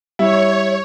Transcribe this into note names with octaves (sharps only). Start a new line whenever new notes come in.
G3 E4 C#5